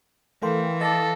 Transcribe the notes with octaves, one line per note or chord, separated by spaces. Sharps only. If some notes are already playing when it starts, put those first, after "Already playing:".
E3 A3 A4 A#4 F5 G5 C6
A4 D#5 F5 D6 A6 A#6